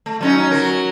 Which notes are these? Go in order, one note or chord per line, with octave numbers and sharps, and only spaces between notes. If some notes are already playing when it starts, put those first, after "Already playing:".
A3
F#3 C#4 D#4
F#3 A#4